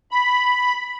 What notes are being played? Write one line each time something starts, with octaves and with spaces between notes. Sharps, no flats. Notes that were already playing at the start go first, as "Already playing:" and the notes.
B5